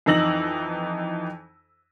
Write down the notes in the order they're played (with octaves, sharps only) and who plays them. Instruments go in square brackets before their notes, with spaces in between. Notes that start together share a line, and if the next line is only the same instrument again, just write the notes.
[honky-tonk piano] F2 E3 D#4 E6 A#6 F#7